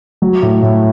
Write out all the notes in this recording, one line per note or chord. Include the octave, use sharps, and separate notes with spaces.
F#3
A2
A2